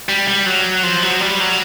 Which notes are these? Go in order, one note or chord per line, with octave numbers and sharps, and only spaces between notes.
G3
G3
F#3
F3
F#3
G3
F#3